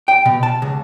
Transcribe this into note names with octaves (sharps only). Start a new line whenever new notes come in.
G5
B2
A5
C#2